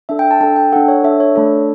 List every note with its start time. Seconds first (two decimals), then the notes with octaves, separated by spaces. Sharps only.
0.09 D4 A4 E5
0.19 G5
0.31 A5
0.41 D4 A4 A5
0.56 G5
0.72 D4 A4 F#5
0.88 C#5
1.04 D4 A4 E5
1.20 C#5
1.36 A3 D4 A4